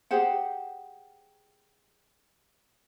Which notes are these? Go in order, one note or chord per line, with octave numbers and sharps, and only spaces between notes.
G4 G#4 C5 F#5